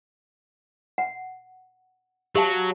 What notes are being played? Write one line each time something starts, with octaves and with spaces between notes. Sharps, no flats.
F#5
F#3 G4 F5 A5